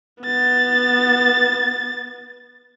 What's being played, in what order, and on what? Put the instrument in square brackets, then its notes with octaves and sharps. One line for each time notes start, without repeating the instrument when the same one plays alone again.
[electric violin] B3 A6